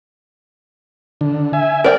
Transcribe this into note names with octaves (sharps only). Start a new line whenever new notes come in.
D3
E5 G#5
A#4 D5 G5